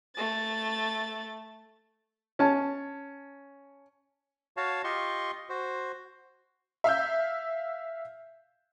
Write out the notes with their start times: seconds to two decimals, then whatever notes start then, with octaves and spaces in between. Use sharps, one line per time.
0.16 A3 A6
2.39 C#4 A5
4.57 F#4 C#5 F5 A5
4.84 F4 G4 D#5 C6 C#6
5.49 F#4 C5
6.84 E5 F5 E6 G6